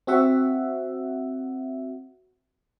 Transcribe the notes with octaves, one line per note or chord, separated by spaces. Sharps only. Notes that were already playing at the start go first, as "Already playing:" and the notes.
C4 F#4 E5 F#5